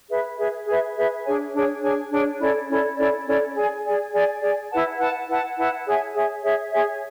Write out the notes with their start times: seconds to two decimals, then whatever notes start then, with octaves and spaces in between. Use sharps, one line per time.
0.09 G#4 B4 E5
0.38 G#4 B4 E5
0.67 G#4 B4 E5
0.96 G#4 B4 E5
1.24 D4 G#4 C#5 G#5
1.53 D4 G#4 C#5 G#5
1.83 D4 G#4 C#5 G#5
2.11 D4 G#4 C#5 G#5
2.40 C#4 E4 A4 D5
2.69 C#4 E4 A4 D5
2.97 C#4 E4 A4 D5
3.26 C#4 E4 A4 D5
3.56 G#4 D5 G#5
3.84 G#4 D5 G#5
4.13 G#4 D5 G#5
4.41 G#4 D5 G#5
4.70 E4 B4 F#5 A5
4.99 E4 B4 F#5 A5
5.28 E4 B4 F#5 A5
5.57 E4 B4 F#5 A5
5.85 G#4 C#5 E5 G#5
6.15 G#4 C#5 E5 G#5
6.44 G#4 C#5 E5 G#5
6.72 G#4 C#5 E5 G#5